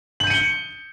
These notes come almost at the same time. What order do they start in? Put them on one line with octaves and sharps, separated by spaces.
F#7 G6 D#7 C#7 G7